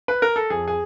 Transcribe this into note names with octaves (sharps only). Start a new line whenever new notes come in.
B4
A#4
A4
F2 G#4
G#4